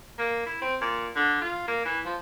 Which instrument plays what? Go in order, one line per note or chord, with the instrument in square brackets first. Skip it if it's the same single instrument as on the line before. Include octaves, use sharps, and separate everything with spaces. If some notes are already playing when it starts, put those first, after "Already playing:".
[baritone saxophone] A#3
E4
C4
A#2
D3
F4
A#3
E3
F3